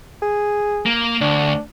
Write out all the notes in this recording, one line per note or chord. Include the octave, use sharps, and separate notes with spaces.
G#4
A#3
D2 D4